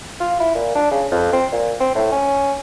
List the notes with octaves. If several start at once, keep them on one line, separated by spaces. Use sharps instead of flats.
F4
E4
A#2
D4
C#3
F2
C4
A#2
C4
A2
C#4